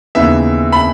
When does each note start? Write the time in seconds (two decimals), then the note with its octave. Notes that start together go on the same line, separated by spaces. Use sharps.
0.15 D#2 C#3 E3 B3 E5
0.73 B5